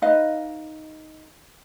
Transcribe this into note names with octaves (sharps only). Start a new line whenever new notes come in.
D#4 B4 D#5 F5